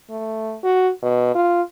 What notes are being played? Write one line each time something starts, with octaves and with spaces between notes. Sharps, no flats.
A3
F#4
B2
F4